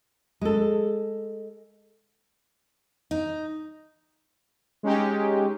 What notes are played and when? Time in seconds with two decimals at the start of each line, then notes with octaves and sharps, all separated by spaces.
0.41 G#3 A4
3.11 D#4
4.83 G#3 C#4 D#4 G4